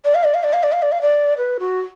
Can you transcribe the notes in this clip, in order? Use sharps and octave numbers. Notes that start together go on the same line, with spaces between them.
D5
F5
D5
F5
D5
F5
D5
F5
D5
F5
D5
B4
F#4